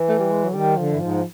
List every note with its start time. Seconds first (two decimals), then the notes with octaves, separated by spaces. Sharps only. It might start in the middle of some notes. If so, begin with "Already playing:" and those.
Already playing: E3
0.09 A3
0.19 G3
0.31 G#3
0.44 F#3
0.50 D3
0.54 D#3 G3
0.77 D3 F3
0.93 G2 E3
1.00 G#2 F3